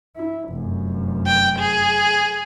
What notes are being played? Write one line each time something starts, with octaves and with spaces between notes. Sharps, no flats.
E4
F1 F#2
G5
G#4